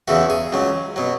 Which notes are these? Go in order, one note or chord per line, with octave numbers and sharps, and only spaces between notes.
E2 C#3 E3 F#4
G#4
C#2 C#3 F#3
B2 F#3